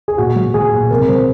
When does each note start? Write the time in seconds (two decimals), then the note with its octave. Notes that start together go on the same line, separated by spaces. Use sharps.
0.08 G#4
0.18 A#2 F#4
0.36 F#3
0.54 F#3 G#4
0.73 A#2
0.90 C3 A#4
1.08 F#3 C5